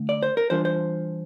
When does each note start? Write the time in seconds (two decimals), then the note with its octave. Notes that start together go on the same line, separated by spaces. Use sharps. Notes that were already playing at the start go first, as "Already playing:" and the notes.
Already playing: D3 A3
0.09 D5
0.23 C5
0.37 A#4
0.50 E3 G3 D4 F4 C5
0.65 C5